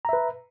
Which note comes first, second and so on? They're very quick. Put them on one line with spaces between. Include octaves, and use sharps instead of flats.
A#5 E5 B4